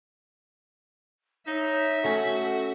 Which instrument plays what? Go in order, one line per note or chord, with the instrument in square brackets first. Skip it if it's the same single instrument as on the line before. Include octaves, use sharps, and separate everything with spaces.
[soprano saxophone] D#4 [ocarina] C#5 [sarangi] E5
[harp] A3 C#4 G#5 [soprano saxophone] F#4 [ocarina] A4